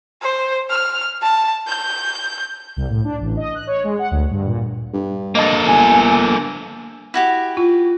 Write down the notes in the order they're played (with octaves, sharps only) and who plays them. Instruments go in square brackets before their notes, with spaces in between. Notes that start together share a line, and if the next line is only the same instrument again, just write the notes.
[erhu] C5
F6
A5
G6
[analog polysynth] C2
A2
D4
A1
D#5
F#6
C#5
G#3
F#5
D2
G2
A#2
[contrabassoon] G2
[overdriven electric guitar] A#3 A4 [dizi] D#5
[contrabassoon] G1 [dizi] G#5
[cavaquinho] E4 F#4 G4
[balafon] F4